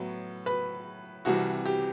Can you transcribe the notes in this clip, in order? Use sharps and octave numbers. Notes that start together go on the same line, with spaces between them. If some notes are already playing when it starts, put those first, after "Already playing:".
Already playing: A2 F#3 B3
B4
C2 C3 E3 G3 F#4
G4